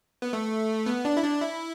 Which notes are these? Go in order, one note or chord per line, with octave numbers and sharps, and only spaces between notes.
B3
A3
B3
D4
E4
D4
E4